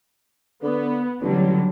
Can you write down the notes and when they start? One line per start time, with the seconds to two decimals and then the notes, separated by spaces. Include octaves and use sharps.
0.63 D3 B3
1.22 A1 D3 F#3 G3